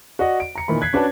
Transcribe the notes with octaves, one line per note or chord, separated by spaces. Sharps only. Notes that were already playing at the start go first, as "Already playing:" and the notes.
F#4 D5 D#5 F#5
D7
A#5 C#7
A#2 D#3 E3 B5
F#6 G#6 B6 C7
C#4 D4 F#4 B4 C#5 A5